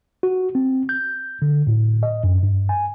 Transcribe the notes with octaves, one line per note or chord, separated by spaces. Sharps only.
F#4
C4
G6
D3
A2
D#5
F#2
G2
G#5